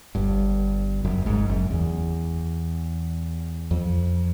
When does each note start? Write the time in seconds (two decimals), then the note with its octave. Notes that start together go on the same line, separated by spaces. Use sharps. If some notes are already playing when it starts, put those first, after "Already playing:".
0.15 G1 G2
1.04 F#1 F#2
1.26 G#1 G#2
1.49 F#1 F#2
1.71 E2
3.71 F2